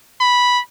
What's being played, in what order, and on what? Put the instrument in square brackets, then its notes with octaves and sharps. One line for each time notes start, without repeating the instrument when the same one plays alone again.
[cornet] B5